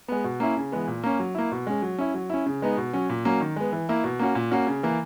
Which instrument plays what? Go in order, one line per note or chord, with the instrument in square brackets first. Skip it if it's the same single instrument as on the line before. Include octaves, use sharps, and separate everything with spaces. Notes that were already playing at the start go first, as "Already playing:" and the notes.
[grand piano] G#3 B3
B2
A#3 C#4 E4
C#3
E3 G#3 B3
A#2
A#3 C#4
F#3
A#3 E4
B2
G#3 C#4
F#3
C#4 E4
F#3
C#4 E4
C#3
G#3 B3 D#4
B2
F#3 C#4
A#2
F#3 A#3 C#4
D#3
G#3 B3
E3
A#3 E4
B2
A#3 C#4 F#4
A#2
A#3 C#4 F#4
C#3
E3 A#3